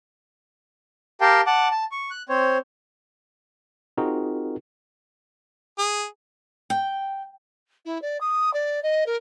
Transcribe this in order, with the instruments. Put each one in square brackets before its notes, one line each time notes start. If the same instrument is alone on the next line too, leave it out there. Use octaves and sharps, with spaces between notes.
[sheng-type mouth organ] G4 A#4 F5 G5 A5
F#5 A5 D6
A5
C#6
F#6
C4 C5 C#5
[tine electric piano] C4 D#4 F4 F#4 G#4 A#4
[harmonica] G#4
[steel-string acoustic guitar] G5
[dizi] E4
D5
D#6
D5
D#5
A#4